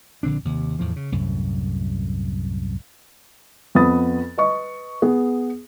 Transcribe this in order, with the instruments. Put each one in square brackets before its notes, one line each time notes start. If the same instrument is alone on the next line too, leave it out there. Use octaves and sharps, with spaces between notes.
[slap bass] A#1 D3 C4 D4
D#2 C3
E2 A2 F3
C#3
C2 F#2 A2
[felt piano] F2 B3 B4 B5 D#6 A6
B4 D#5 C#6
B3 G#4